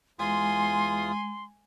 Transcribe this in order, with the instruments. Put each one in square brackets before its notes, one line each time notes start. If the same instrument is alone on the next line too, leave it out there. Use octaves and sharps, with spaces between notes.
[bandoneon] E2 F4 D#6 [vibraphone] G#3 [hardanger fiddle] G#5 [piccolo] C6